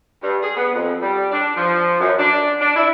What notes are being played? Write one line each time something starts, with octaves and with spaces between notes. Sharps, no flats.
G2
G#4
B3
F2
G3
D4
F3
F#2
D4
D4
E4